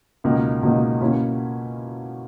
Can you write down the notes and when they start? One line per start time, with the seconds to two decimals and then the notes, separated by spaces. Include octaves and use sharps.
0.24 C#2 B2 A#3 D#4
0.63 C#2 B2 A#3 D#4
1.01 B2 A#3 C#4 E4